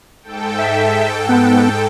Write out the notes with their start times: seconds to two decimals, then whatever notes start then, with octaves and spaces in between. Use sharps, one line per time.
0.23 G#2 A4 G5
0.59 E5
1.29 B3